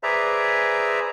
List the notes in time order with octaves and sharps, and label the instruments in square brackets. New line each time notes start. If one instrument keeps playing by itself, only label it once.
[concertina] G#4 B4 C5 D5 E5 A#5